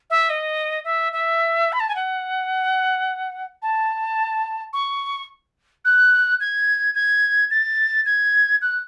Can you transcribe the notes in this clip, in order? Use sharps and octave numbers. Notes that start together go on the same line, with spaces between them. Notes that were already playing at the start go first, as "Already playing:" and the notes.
E5
D#5
E5
E5
B5
A5
G#5
F#5
A5
C#6
F#6
G#6
G#6
A6
G#6
F#6